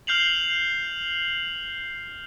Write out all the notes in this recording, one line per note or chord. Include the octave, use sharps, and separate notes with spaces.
F6 G6 C7 F7 F#7